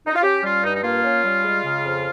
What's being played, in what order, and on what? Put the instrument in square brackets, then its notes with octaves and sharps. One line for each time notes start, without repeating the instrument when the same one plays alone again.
[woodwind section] D#4
F4
C#4 G4
G3 F4
G2 D#4
D#4
A#3 F4
C#4
G3
G#3
C#3
F2